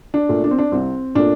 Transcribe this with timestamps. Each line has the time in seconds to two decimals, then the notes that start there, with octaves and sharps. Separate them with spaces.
0.14 D4
0.29 A#2 A3
0.44 D4
0.51 C4
0.58 D4
0.72 C2 C4
1.15 A#2 A3 D4